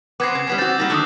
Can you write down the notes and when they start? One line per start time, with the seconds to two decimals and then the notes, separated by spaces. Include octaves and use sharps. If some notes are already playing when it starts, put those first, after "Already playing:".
0.20 B3 C4 D6 G#6 C7
0.35 C#3 G#6 C7
0.47 G3 B3 C#4
0.58 C4 F#4 E6 G6 A6
0.78 G3 A#3 D#4
0.90 D3 D#3 A3 D#6 E6 F#6